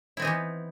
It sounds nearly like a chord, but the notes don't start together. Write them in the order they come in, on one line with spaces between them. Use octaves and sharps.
E4 C4 D#4 E3 B3